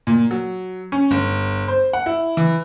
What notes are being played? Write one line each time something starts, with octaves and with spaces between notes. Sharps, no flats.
A#2
F#3
C#4
G1
C5
F#5
E4
E3